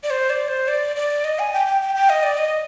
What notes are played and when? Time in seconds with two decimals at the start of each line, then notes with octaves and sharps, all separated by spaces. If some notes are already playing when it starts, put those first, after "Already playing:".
0.03 D5
0.10 C5
0.30 D5
0.48 C5
0.68 D5
0.96 D5
1.24 D#5
1.39 G#5
1.53 G5
1.66 G5
1.81 G5
1.95 G5
2.10 D#5
2.23 D5
2.38 D#5